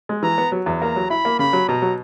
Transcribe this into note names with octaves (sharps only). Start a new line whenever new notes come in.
G#3
E3 A#5
B3
F#3
E2
A#3 A#5
F#3
E4 B5
A#3
C#3 B5
F#3
B2 A#5
F#3